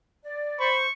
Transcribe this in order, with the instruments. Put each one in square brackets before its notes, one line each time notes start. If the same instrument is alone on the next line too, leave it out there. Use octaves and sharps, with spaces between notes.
[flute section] D5
[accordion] C5 [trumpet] B5 [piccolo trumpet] C#6